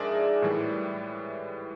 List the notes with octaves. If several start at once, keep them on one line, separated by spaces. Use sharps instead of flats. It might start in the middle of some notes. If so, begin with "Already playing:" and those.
Already playing: G#2 F3 G#3 D4 G#4 A#4 D5 E5
A2 E3 G3